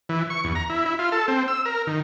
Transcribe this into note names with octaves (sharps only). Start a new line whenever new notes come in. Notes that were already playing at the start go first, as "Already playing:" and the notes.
E3
C#6
E2
A#5
E4
E4
F4
A4
C4
E6
A#4
D#3